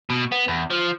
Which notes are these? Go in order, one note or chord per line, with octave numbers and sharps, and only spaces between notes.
B2
B3
E2
F3